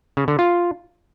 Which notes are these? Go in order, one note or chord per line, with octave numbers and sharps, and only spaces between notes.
C#3
D3
F4